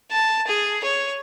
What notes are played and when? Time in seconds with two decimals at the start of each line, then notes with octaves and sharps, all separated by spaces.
0.12 A5
0.47 G#4
0.84 C#5